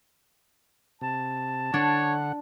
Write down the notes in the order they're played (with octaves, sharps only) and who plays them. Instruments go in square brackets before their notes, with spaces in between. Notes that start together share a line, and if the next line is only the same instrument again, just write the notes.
[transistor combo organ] C3 [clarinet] A5
[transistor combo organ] D3 F#5 [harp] D4 [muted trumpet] C#5